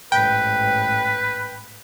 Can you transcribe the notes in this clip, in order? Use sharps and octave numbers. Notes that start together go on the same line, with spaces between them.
A1 G#2 B4 G5